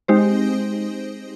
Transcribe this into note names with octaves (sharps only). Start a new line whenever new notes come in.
G#3 C4 D#4 G4 C5